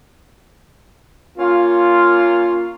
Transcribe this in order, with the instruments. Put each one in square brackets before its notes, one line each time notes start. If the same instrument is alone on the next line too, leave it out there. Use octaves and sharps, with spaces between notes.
[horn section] A#3 C#4 F4